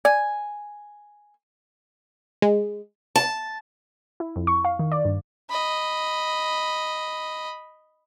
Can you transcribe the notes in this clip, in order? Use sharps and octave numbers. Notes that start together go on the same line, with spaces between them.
D5 G#5
G#3
A5
E4
F2
C#6
F5
D#3
D5
G2
D#5 B5